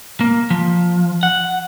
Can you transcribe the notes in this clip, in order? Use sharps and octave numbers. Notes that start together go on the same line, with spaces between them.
A#3
F3
F#5